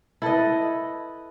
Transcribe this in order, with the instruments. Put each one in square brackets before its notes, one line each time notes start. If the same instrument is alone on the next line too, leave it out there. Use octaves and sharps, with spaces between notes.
[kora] E4 A4 B4 D#5